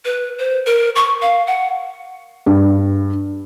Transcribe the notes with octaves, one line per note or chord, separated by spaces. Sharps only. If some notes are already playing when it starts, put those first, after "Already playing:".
B4
C5
A#4
C#6
F5
F#5
G2